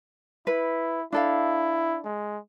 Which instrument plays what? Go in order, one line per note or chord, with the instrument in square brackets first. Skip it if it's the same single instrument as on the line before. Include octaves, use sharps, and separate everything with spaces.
[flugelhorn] E4 [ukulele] B4
[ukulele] D4 A4 F5 [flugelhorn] E4
[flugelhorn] G#3